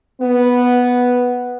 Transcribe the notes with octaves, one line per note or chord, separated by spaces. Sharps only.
B3